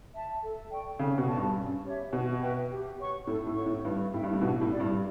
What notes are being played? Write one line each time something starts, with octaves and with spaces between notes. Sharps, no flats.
E5 A5
A4
D5 G5 C#6
C#3 A4
B2
D5 A5 C#6
G2
C#4
G4 C#5 E5
B2 F#4
B4 E5 G5
G4
C#5 F#5 C#6
A2 A4
A2
C#5 F#5 C#6
A2
G2 B4
A2 E5 G5
G2
A2
B2 D4
A2
G4 D5 F#5
G2